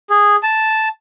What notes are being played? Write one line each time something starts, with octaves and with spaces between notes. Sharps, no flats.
G#4
A5